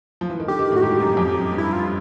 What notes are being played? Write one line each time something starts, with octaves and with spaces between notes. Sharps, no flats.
F3
E3
D#3
D3 G4
D#3
A2 F#4
G#2 G4
F#2
F#2
F2
F#2
G2
E4
F4